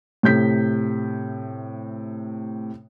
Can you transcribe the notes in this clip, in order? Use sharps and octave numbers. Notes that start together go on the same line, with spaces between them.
A2 C3 G6 B6